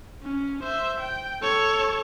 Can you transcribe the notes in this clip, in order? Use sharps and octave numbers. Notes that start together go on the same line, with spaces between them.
C#4
C5 E5
G5
A4 C#5